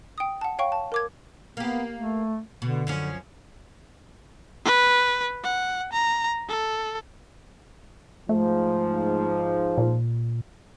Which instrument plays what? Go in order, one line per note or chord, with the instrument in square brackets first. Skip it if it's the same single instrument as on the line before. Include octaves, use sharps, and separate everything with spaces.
[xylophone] G5 D#6
F#5 A5
C#5 F5 G5 C#6
A5
A#4 D6 G#6
[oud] A#3 G4 [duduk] B3
[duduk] A3
[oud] B2 [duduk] D3
[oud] F#2 F3 C#4
[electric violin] B4
F#5
A#5
A4
[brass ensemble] G#2 F3 [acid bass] A3
[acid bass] A#2